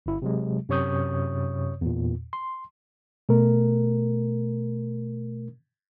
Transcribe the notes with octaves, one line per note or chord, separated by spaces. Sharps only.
G1 E4
C3 F#3 G#3
F#2 C3 C#5 C#6 D#6 G6
E2 A#2
C6
B2 A3 A#4